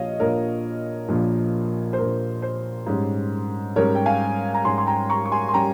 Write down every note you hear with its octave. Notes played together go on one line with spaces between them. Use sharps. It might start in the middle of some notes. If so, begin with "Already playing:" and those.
Already playing: A#1 A#2 F3 C#5 D#5 F5
A#1 A#2 F3 A#4 C#5
A#1 A#2 F3
C5
A#1 A#2 F3 A#4
C5
G#2 G3 C#4
G#2 G3 C#4 A#4 C#5
G5
F5 G#5
A#5
G#2 G3 C#4 G#5 C6
C6
G5 A#5
A#5 C#6
C#6
G#5 C6
C6
G3 C#4 G5 A#5